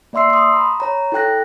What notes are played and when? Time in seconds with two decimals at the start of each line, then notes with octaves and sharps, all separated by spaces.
0.13 A#3 D5 E5 C6 E6 C7
0.30 C6 D#6
0.53 A#5 B5
0.80 C#5 A#5
1.12 E4 A4 G5 F#6 A#6